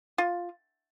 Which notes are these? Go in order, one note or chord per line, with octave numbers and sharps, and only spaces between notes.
F4